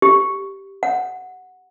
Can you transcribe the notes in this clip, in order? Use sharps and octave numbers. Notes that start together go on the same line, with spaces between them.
G4
F#5